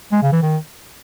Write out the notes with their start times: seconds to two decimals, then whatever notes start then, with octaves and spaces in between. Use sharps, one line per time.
0.12 G#3
0.22 C#3
0.32 E3
0.43 D#3